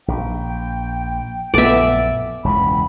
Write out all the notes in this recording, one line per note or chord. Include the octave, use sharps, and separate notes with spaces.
A#1 G5
A#1 F#2 A3 B3 D5 E5
E1 C#2 E3 B5